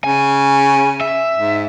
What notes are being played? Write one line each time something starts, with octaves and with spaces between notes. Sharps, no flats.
C#3 G#5
E5
G#2